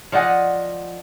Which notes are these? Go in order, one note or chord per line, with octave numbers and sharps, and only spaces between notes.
F3 D5 D#5 F#5 G#5